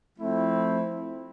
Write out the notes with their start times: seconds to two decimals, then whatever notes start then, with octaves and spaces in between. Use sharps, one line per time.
0.17 F3 A3 C4 E4